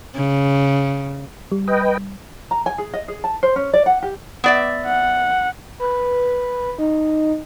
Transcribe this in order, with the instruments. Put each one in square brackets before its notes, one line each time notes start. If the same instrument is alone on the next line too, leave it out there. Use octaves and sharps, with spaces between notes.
[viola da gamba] C#3
[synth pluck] G3
[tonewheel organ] B4 D#5 G5
[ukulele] A#5
G#5
G#4
D#5
G#4
A5
C5
C#4
D5
F#5
G4
[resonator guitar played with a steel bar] B3 D5 E5
[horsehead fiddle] F#5
[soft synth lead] B4
D#4